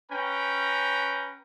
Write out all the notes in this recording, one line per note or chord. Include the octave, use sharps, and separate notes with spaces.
C#4 B4 G5 A#5